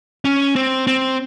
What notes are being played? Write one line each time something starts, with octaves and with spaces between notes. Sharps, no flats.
C#4
C4
C4